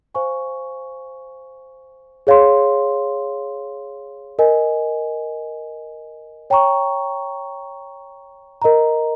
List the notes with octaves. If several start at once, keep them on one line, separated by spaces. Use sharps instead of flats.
C5 F5 G#5 C#6
G#4 C#5 F5 C6
A#4 D#5 G#5
C#5 G5 A#5 C#6
A#4 D#5 A#5